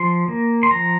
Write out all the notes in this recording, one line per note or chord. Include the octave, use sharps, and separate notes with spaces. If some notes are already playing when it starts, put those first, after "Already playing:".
Already playing: F3 C6
A#3
C6
F3 A#5